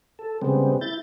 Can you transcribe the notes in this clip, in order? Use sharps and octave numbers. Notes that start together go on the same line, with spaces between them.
A4
C#3 G3 G#3 B3 C4
E4 G6 A6